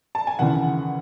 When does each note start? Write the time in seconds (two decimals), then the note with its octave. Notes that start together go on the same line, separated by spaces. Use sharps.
0.15 A5
0.27 G#5
0.39 D#2 C#3 E3 F#5